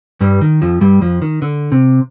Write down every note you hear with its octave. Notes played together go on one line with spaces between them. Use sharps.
G2 G3
D#3
F2 F3
G2 G3
F2 F3
D#3
D3
C3